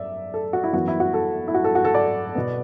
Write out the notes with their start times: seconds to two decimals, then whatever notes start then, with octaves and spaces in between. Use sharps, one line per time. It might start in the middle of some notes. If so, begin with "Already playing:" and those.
Already playing: F#2 D5 E5
0.34 A4
0.53 F#4
0.64 E4
0.73 F#2 E3 B3 F#4
0.88 E4
1.00 F#4
1.14 A4
1.48 E4
1.54 F#4
1.64 A4
1.75 F#4
1.85 A4
1.95 D5
2.35 B2 B3